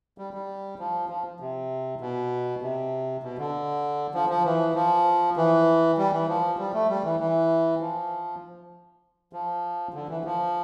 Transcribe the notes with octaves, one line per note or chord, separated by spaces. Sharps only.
G3
G3
F3
F3
C3
B2
C3
B2
D3
F3
F3
E3
F3
E3
G3
E3
F3
G3
A3
G3
E3
E3
F3
F3
D3
E3
F3